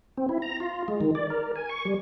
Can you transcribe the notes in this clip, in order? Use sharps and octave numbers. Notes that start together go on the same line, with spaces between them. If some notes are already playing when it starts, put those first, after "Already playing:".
C4
E4
A#5
F4
G#3
D#3
D5
A#4
G#5
C#6
G3